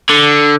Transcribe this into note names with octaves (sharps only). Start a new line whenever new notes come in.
D3